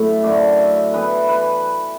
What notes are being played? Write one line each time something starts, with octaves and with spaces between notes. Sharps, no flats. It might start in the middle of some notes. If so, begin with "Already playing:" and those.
Already playing: F#2 A2 D3 E4 B4 E5
F#2 D3 A3 D4 D5
E5
E3 B3 E4 B4
B4